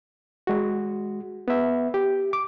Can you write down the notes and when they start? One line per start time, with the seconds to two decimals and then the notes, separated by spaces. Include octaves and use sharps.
0.47 G#3 F#4
1.48 B3 E5
1.94 G4
2.33 D6